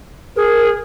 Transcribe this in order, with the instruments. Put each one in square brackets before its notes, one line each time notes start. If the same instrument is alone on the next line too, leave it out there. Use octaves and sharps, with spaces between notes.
[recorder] G#4 [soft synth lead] A#4